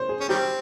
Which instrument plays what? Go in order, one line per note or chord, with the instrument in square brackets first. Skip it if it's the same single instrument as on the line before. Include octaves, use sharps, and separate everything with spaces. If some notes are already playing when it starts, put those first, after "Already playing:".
Already playing: [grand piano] C5 C#5
G#4
[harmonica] C#4
[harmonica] D#3 G3 C4 [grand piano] G4